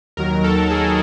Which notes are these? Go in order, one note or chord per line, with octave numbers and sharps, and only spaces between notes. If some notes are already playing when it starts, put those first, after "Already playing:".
D#2 D#3 F#3 A#4
A4
G#4